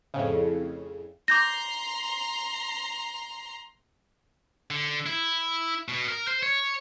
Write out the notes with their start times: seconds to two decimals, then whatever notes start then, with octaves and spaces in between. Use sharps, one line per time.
0.14 F2 A2 C#3
1.28 A#5 C6 D6 G6 A#6
4.70 D3
5.06 E4
5.88 B2
6.08 A#4
6.28 C5
6.43 C#5